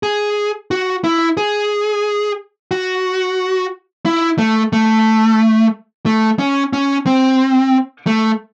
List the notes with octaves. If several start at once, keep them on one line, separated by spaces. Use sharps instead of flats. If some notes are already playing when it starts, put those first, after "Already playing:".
G#4
F#4
E4
G#4
F#4
E4
A3
A3
A3
C#4
C#4
C4
A3